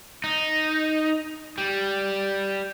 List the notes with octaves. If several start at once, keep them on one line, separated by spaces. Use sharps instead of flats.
D#4
G3